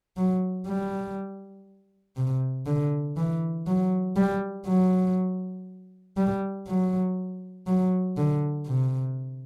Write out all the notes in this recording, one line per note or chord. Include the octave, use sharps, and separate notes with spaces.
F#3
G3
C3
D3
E3
F#3
G3
F#3
G3
F#3
F#3
D3
C3